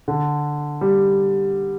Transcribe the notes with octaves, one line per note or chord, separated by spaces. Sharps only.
D3
G3